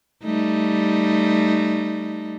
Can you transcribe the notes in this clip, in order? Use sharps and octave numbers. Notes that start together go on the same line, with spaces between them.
G3 A3 D#4